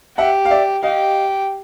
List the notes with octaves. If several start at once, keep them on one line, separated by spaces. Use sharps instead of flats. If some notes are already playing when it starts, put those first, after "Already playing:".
G4 E5 F#5
F5
D5 E5
G4 D#5 F5